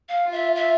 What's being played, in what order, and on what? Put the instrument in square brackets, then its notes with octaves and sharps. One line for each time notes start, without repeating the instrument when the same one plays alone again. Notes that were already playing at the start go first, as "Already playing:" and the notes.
[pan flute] F5
[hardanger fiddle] F4
[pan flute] E5
E5